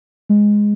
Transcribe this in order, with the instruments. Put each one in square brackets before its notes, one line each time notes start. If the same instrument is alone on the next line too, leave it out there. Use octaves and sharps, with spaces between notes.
[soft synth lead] G#3